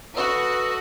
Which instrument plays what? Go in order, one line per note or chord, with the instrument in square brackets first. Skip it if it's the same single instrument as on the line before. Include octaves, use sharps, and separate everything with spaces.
[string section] F#4 [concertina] A4 D#5 [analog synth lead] B4